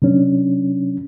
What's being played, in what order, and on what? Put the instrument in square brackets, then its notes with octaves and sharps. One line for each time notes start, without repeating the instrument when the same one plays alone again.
[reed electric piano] C3 F#3 C#4 D4